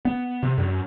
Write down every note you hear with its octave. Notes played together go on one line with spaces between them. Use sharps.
B3
C3
F#2